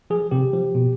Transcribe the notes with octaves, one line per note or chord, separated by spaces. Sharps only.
F3 G#4
C3 G4
F3
B2